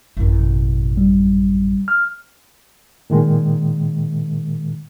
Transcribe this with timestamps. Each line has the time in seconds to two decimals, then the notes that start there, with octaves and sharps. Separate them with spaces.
0.17 A1 F#2
0.39 B2
0.97 G3
1.88 F6
3.10 A#2 D#3 G#3